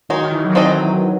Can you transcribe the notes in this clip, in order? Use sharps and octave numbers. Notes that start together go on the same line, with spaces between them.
D#3 G#3 D#4 F#4 C#5
D#3
E3
F#3
C4 D#4 A4 D#5